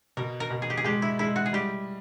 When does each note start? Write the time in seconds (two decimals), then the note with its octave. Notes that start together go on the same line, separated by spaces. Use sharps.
0.17 B2 A#4
0.40 A#4
0.50 B2
0.62 G#4
0.70 G4
0.77 G#4
0.85 G#3 G4
1.02 E4
1.19 G#3 E4
1.36 F#4
1.46 G#4
1.53 G3 G4